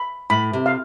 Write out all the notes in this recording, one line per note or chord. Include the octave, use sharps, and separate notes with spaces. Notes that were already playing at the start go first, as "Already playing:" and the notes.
Already playing: B5
A2 B5
C3
F5